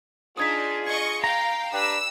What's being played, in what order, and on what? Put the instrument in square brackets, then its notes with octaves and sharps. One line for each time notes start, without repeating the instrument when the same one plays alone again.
[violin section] D4 D#4 [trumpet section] F4 G#4 [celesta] D#6 G#6 B6
[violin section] D#5 C#6 [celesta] G#6
[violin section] F5 G5 [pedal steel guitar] A#5
[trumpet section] D4 G4 B4 [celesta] G5 [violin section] E6